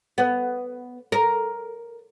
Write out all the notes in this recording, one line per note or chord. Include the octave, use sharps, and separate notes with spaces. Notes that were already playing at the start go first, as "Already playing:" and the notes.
B3
A#4